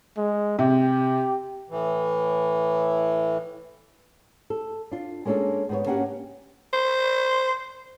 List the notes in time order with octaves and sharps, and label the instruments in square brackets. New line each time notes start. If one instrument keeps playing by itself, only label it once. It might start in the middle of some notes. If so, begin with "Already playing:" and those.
[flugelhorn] G#3
[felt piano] C3 [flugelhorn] G4
[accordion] A2 E3
[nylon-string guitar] A4
D4 F4
G#3 A#3 C#4 D4 G#4 A4
G#2 B3 C#5
A#3 C#4 D4 F#4 G4 F#5
[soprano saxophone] C5